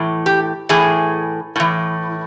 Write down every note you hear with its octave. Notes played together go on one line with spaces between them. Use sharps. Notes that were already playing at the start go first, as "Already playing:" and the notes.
Already playing: A2 E3
G4
A2 E3 G#4
A2 E3